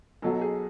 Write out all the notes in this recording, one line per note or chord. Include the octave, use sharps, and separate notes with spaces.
B1 B2 F#3 A4
G#4